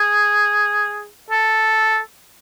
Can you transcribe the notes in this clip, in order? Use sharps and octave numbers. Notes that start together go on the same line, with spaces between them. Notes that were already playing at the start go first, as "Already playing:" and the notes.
Already playing: G#4
A4